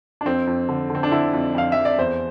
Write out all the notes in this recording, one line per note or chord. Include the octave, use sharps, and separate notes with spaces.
D4
F2 C4
F2
D3
D3
C4
D4
D3 E4
F2
F2 F5
F2 E5
D5
E2 C5